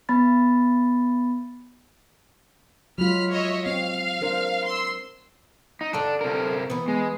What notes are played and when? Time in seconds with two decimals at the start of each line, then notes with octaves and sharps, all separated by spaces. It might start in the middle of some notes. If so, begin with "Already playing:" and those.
0.09 B3 B5 A6
2.98 F#3 G#3 F4 B5 F6
3.31 C#5 D#5 E5
3.66 C4 F5
4.21 D4 A#4 C5
4.66 C6 E6
5.81 D#4
5.93 G2 D3 D4 A4
6.21 C3 A#4
6.70 E3 B3
6.88 G#3